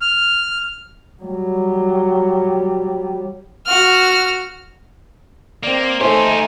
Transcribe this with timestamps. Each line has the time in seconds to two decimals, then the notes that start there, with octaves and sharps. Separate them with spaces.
0.02 F6
1.23 F#3 G3
3.66 F#4 F6
5.63 A#3 C4 D5
6.01 A3 D#4 G4 C5 G#5